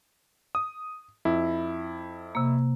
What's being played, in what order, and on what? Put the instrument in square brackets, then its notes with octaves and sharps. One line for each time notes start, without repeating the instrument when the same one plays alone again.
[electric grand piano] D#6
F2 E4
[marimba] C3 A#3